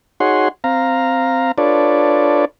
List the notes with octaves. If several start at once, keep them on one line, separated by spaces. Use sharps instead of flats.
D#4 F#4 G#4 C#5 F#5 C6
C4 F5 A#5
D4 F4 A4 B4 C#5 D5